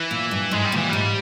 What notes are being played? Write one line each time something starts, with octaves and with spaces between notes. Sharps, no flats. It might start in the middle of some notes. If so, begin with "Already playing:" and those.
Already playing: E3
A#2
G2
G#2 G#3
G3
A#2 E3
G#2 G3